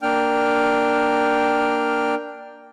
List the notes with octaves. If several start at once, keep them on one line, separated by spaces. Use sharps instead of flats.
A#3 D4 G5 F6